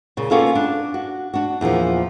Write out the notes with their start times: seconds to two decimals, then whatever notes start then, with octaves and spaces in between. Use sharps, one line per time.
0.17 A#2 C#3
0.31 A#3 B3 C#4 F4 A4 F5
0.55 D4
0.94 F#4
1.34 D4 F#4
1.61 E2 A#2 D3 F3